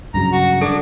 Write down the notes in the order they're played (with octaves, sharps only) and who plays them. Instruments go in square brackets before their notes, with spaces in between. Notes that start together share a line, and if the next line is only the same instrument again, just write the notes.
[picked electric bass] G2 C#3 F#3 [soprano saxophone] A#5
[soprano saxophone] F#4
[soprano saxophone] D4 [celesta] A4